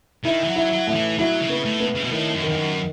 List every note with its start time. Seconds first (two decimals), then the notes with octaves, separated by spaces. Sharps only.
0.25 D#3 E4
0.44 E3
0.48 F#3
0.56 E4
0.72 F#3
0.87 A2
0.94 E3
1.18 F#3 E4
1.41 C#3
1.49 B3
1.65 A2
1.80 B3
1.95 C#3
2.04 B2
2.11 A2 D#3
2.34 F#2
2.42 D#3
2.48 E2
2.57 F#2
2.73 D#3